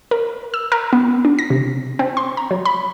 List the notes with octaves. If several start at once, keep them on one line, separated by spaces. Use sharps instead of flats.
A#4
E6
A#4
B3
D4
A#6
C3
C4
C6
A#5
F#3
B5